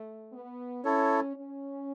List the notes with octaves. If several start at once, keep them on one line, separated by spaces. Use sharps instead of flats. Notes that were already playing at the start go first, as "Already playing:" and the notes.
Already playing: A3
B3
C#4 E4 A4 C#5
C#4